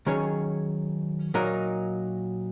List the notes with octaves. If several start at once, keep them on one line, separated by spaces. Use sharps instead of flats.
D#3 F#3 C#4 G#4 C#5
A#2 F#3 D#4 A#4